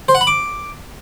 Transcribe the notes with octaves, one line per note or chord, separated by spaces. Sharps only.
C5
F#5
B5
D6